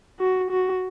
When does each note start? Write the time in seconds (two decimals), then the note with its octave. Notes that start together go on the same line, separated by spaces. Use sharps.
0.20 F#4
0.51 F#4